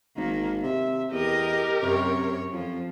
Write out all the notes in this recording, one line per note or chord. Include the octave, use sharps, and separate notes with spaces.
G#1 D#3 A#3
C3 E5
E2 G4 A#4 D#5
F#2 C3 C#5
F2 F3